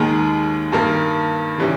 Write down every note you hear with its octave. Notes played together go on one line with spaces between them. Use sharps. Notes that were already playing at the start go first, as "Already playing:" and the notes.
Already playing: D#2 D#3 G#3
G2 D#3 A#3
C#3 E3 G3 C#4